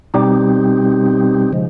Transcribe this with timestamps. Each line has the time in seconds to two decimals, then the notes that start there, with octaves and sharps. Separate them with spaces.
0.14 B2 G3 C4 D#4 G4
1.53 C#3 F3 G#3